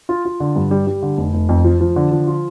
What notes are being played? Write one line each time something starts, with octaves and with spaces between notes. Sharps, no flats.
F4
F4
D3
G2
G3
G3
D3
F1
F1
F2
F3
F3
D3
F3
F4